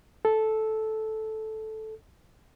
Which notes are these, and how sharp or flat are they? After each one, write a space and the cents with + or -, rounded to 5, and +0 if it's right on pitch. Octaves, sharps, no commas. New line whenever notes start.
A4 -10